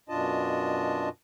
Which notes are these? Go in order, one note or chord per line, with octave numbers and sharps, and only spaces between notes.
F#2 B2 D4 F4 D#5 A5